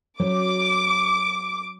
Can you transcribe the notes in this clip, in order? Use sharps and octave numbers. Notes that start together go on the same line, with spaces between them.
F#3 D6